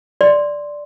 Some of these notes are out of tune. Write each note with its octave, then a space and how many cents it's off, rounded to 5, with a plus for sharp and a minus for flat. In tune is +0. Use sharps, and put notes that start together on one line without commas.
D5 +0 C6 +0